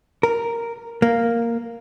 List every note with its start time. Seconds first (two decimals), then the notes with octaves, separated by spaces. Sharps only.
0.23 A#4
1.02 A#3